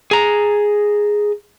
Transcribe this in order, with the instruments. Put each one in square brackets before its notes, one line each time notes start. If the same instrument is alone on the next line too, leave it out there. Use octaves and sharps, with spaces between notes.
[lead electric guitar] G#4 A#5